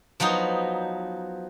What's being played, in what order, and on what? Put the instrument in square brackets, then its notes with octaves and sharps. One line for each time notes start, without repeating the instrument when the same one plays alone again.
[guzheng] F3 F#3 B3 D#4